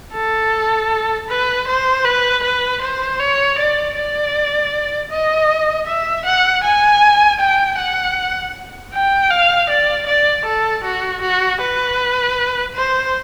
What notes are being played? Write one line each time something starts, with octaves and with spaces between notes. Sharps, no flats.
A4
B4
C5
B4
B4
C5
C#5
D5
D5
D#5
E5
F#5
G#5
G5
F#5
G5
F5
D5
D5
A4
F#4
F#4
B4
C5